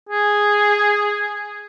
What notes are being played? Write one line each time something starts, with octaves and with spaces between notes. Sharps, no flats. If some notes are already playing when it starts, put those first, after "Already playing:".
G#4